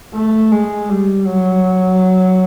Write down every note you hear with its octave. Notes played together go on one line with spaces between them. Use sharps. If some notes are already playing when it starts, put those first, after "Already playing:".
A3
G#3
G3
F#3